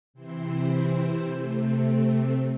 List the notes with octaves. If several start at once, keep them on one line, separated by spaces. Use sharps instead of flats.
C3 E3 C4 E4 C5
C3 A3 C4